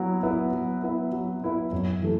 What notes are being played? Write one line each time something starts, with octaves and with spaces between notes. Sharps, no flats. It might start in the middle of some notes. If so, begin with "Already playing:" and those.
Already playing: F#3 B3 E4
B3 E4 B4 E5
F#3
B3 E4 B4 E5
F#3
B3 E4 B4 E5
F#2
E3 A3